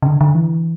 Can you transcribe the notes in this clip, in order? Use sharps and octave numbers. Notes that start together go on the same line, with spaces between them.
C#3
D3
D3
E3